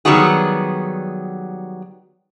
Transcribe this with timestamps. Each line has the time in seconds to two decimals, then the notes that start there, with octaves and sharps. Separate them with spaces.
0.05 D#3 F#3 G3 B3 F#4 G#4